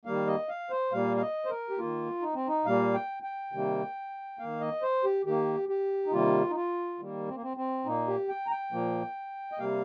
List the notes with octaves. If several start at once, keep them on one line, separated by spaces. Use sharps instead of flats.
D#3 G3 A#3 F5
D#5
F5
C5
A#2 G3 A#3 F5
F5
D#5
C5
A#4
G4
D#3 A#3 F4
D#4
C4
D#4
A#2 G3 A#3 F5
G5
G5
C3 D#3 G3 A#3
D#3 A#3 F5
D#5
C5
G4
D#3 A#3 G4
G4
D#4
C3 D#3 G3 A#3 F4
D#4
F4
D#3 G3 A#3
C4
A#3
C4
C4
A#2 A#3 D#4
G4
G5
A#5
G5
A#2 F3 A#3
D#5
C3 G3 A#3 F5